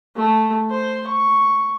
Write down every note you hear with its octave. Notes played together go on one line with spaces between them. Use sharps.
A3
C5
C#6